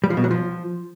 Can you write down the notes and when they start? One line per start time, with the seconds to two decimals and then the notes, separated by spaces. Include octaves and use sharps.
0.04 G3
0.10 F3
0.17 B2
0.24 F#3
0.31 F3